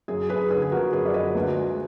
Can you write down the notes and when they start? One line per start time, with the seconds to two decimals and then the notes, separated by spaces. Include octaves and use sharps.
0.08 F#2 G#4
0.29 F#2 G#4 B4
0.50 D3 G#4 B4
0.62 G#4
0.72 F3 F#4 A#4
0.93 F#2 G#4 B4
1.06 D5
1.14 F#2 B4 D#5
1.35 D2
1.56 G#3